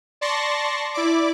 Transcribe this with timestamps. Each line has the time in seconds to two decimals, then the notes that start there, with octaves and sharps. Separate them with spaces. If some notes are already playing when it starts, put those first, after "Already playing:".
0.21 D5 A5 C6 C#6 A#6
0.94 E4 D5 D6